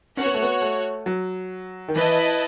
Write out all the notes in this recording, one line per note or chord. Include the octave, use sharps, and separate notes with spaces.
C#4 F#4 C#5 F#5
B3
A3
B3
A3
F#3
D#3
E3 E4 B4 D#5 A5